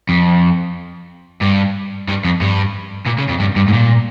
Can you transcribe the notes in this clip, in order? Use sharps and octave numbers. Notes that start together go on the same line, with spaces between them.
F2
G2
G2
F2
G2
A#2
C#3
F2
G2
G2
G#2
A#2